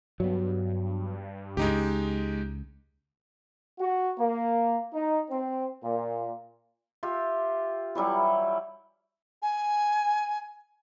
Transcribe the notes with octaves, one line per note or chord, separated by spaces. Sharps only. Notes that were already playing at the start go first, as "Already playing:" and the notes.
G2 F#3 B3
C#2 G#3 D#4 G4
F#4
A#3
D#4
C4
A#2
F4 G4 E5
E3 F#3 G3 E4
G#5